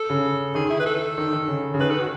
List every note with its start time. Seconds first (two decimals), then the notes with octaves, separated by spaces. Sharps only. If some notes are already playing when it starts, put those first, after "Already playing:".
Already playing: A4
0.10 C#3
0.55 D#3 G#4
0.70 E4
0.79 B4
0.86 A4
1.18 D#3
1.33 D#3
1.48 C#3
1.74 C#3
1.80 D#3 B4
1.90 A4
2.00 F#4